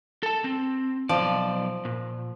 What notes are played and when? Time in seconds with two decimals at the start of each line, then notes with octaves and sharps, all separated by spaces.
0.23 A4 A5
0.44 C4
1.09 B1 F3 D5
1.85 A#2